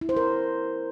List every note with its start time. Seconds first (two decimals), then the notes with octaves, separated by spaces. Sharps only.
0.01 E4
0.09 C5
0.17 A#4